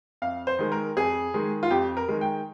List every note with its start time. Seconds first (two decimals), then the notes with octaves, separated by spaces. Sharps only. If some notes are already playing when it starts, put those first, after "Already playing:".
0.22 F2 F5
0.47 C5
0.59 D#3 G#3
0.72 A#4
0.96 F2 G#4
1.34 D#3 G#3
1.63 F4
1.71 F2 G4
1.97 A#4
2.08 D#3 G#3
2.21 G5